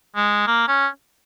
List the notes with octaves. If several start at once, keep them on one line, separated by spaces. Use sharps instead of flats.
G#3
A#3
C#4